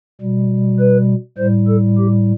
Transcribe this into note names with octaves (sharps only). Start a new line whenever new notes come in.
B2 G3
B4
A2 G3 C5
A4
G4